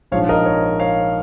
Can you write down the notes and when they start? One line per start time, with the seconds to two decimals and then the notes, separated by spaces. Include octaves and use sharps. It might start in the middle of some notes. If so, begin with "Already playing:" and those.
0.12 A#1 G#2 F3 C#5 F5
0.29 A#4 D#5
0.46 C#5
0.80 C#5 F5